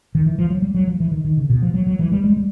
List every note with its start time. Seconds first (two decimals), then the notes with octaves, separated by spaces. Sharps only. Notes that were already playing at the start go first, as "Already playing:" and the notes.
0.15 D#3
0.26 E3
0.38 F3
0.50 F#3
0.62 G3
0.74 F#3
0.87 F3
1.00 E3
1.12 D#3
1.25 D#3
1.37 C#3
1.50 B2
1.62 F3
1.74 F#3
1.87 F#3
1.99 E3
2.12 G3
2.24 G#3
2.37 G3